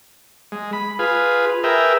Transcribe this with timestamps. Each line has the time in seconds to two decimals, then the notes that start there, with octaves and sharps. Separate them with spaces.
0.52 G#3
0.73 B5
0.99 F4 G#4 B4
1.64 G#4 A#4 B4 E5 G5